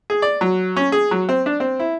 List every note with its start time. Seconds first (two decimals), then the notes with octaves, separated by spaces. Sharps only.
0.10 G#4
0.22 D5
0.41 F#3
0.76 C#4
0.92 G#4
1.11 F#3
1.29 C4
1.46 D4
1.60 C4
1.79 E4